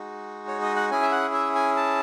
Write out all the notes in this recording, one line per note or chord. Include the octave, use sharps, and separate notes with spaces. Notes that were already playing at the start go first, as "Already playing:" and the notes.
Already playing: G#3 D#4 F#4
C#5
D#5
F#5
C#4 E4 G#4 G#5
E5
F#5
E5
G#5
A5